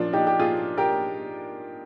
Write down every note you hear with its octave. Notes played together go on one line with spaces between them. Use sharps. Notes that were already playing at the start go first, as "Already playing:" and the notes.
Already playing: A#2 F3 D4 F4
D#4 G4
G4
F4 G#4
G4 A#4